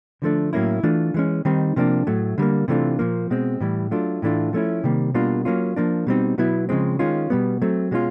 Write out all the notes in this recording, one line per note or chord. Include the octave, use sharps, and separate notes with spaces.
D3 F3 A3 D4
A2 F#3 A#3 C#4 E4
E3 A3 D4 F4
E3 G#3 C#4
D#3 G3 C4 D#4
C3 F3 A#3 D4
A2 F#3 A3
D3 G3 A#3
C3 E3 A3 D4 F4
A#2 F3 A#3
B2 G#3 C4
A2 E3 G3
F#3 A3 D4 F4
A2 E3 A3 D4 F4
F3 A3 C#4 E4
C3 D#3 G3 A#3
B2 G3 A#3 D4 F4
F#3 A#3 C#4 F4
F3 A#3 D4
B2 G3 C4 D#4
B2 F#3 B3 E4
C#3 F3 G#3 C4
D#3 G#3 C#4 F4
B2 G3 B3
F#3 A3 C4
B2 G#3 C#4 F4